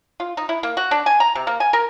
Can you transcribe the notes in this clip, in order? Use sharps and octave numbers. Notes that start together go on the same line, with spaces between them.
F4
D#4
E4
A#3
F#4
D4
G#5
A#5
C3
A#3
G#5
A#4